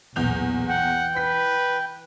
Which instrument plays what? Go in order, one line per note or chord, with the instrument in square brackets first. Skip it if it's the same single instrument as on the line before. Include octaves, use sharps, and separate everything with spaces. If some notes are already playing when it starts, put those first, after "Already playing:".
[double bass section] B1 A#2 [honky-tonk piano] E2 G6 F7
[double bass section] E3 [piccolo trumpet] F#5 [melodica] G5
[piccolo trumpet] B4 [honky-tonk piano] B6